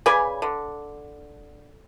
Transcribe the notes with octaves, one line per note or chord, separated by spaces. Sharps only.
C#3 B4 D5 G#5
D3